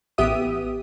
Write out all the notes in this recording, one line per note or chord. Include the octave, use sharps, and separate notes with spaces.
A1 B3 G4 E5 D#6